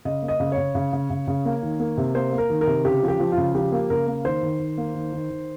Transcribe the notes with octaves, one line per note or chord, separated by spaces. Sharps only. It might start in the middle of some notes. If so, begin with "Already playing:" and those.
C#3 D#5
A#3
D#5
C#3
C#5
C#3
C#3
C#3
C#3
C#3
A#3
D#3
A#3
C3
A#3 C5
A#3
A#4
D#3
A#4
C3
C#3 G4
F3
G4
F3
F4
C#3
F3 G4
A#3
C#3 A#4
A#3
D#3 C5
D#3
D#3
A#3
D#3
D#3
D#3